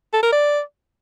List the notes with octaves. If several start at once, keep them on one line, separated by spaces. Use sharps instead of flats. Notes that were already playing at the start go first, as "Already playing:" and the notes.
A4
A#4
D5